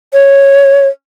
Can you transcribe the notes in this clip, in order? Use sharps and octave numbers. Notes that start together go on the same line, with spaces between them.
C#5